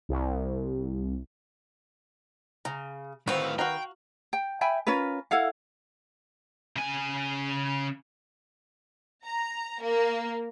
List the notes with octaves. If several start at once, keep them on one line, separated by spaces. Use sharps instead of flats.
C2
C#3 A#5
A2 D#3 A3 C4 F#4 B4 F5
F#4 F5 G5 A#5
G5
E5 G5 G#5 B5
C#4 F4 A#4 B4
E4 A4 F5 F#5
C#3 G#5
A#5
A#3